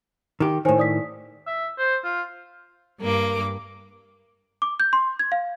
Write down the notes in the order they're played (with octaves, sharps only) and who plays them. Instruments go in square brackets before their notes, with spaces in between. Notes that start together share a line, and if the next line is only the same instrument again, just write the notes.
[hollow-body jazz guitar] D#3 G4
[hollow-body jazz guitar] A2 D#3 [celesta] C5 C#5 G#5
[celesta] D5 D#6 B6
[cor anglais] E5
C5
F4
[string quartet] G2 A#3 D6
[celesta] D6
G6
C6
G#6
F5